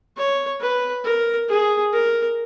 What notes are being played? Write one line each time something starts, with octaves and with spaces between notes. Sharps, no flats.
C#5
B4
A#4
G#4
A#4